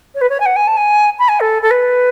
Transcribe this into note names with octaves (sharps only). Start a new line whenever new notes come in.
C#5
B4
C#5
G#5
F#5
G#5
A5
G#5
B5
G#5
A4
A4
B4